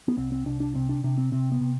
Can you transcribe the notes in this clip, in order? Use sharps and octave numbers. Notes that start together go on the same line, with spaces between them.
B3
C2 C4
C4
C2 D4
D4
C3 C4
D4
C3 D4
C4
C3 C4
B3
C3